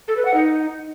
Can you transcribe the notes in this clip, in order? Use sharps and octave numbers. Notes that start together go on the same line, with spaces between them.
A4
B4
F#5
D#4